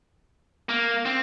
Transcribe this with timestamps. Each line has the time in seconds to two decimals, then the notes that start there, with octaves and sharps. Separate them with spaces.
0.69 A#3
1.05 C4